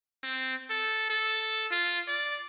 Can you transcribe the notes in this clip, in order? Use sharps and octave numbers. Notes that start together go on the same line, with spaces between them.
C4
A4
A4
F4
D5